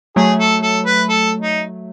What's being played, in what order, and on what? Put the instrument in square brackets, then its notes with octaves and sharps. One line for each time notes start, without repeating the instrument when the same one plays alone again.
[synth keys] F#3 A3 [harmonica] G#4
[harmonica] A4
A4
B4
A4
D#4